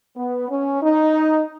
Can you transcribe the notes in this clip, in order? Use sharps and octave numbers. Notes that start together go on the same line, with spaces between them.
B3
C#4
D#4